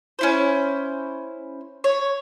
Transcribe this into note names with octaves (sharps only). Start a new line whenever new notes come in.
C#4 E4 C5
C#5